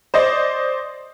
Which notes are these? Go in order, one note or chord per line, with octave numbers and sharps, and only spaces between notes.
C5 D5 D#5